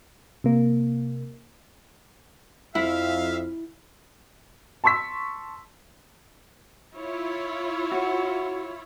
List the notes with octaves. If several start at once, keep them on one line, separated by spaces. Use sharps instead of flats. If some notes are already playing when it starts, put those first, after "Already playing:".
C3 A#3
F2 E4 E5 F5
A5 C6 C#6 E6 B6
E4 F4 C#5
F#4